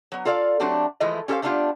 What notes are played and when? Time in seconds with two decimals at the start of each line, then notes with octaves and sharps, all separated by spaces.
0.12 F#3 B3
0.25 F4 A4 D5 E5 F5
0.60 F#3 A3 C4 D4 F#4 G4
1.00 E3 F3 G#3 A3 E4 D#5
1.28 C#4 G4 A4 B4 C5 F5
1.42 A3 B3 D4 D#4 F4 G4